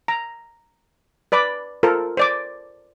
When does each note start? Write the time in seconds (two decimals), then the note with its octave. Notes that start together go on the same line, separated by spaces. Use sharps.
0.08 A#5
1.32 B4 D5 B5 D6
1.83 F4 A4 A#4 C5
2.17 C5 D5 D6